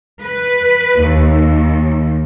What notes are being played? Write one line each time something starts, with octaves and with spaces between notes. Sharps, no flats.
B4
D#2